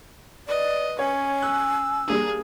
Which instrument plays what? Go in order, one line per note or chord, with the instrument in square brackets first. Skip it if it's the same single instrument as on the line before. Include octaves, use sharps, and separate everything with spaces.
[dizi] B4 [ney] D5 [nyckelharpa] D#5
[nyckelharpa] C#4 [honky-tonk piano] C#5 [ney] G#5
[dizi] E6 [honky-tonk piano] F#6
[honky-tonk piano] G3 A#3 D4 [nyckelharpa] G#4